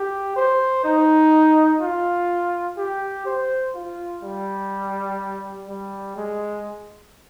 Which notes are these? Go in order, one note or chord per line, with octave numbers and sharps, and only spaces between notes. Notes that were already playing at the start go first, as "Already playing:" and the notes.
Already playing: G4
C5
D#4
F4
G4
C5
F4
G3
G3
G#3